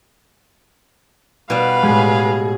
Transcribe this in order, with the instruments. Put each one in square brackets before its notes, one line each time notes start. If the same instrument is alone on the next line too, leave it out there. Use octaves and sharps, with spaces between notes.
[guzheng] B2 G3 [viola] B4 F5
[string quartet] A2 G#4 [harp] G#3 G4